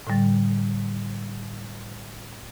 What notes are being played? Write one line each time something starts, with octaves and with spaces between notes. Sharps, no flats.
A2 D3 G3 A6